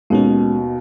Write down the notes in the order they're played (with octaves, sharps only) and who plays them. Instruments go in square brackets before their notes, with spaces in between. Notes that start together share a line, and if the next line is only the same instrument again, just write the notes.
[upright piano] D#2 B2 [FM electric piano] G#3 B3 C#4